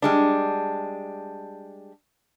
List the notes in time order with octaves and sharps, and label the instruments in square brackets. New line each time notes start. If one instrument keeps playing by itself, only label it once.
[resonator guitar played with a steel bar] G3 G#3 D4